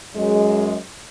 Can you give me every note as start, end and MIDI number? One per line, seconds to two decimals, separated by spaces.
0.15 0.77 42
0.15 0.77 56